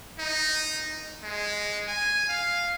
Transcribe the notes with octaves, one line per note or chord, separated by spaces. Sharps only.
D#4
G#3
G#5
F5